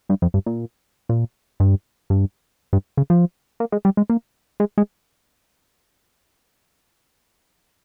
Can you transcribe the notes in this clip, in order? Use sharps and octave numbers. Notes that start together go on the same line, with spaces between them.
G2
F2
G2
A#2
A#2
G2
G2
G2
C#3
F3
A#3
G#3
G3
G#3
A#3
G#3
G#3